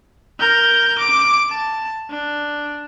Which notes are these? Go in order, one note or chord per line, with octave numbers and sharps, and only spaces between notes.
A#4 G6
D6
A5
D4